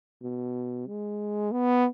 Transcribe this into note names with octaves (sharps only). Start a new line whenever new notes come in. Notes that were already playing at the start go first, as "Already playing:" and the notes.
B2
G#3
B3